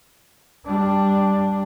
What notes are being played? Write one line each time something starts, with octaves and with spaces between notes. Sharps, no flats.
G3 D4